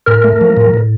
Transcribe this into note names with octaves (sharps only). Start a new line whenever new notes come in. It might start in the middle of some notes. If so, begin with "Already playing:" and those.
A2 A#4
A3
F3
A2
A2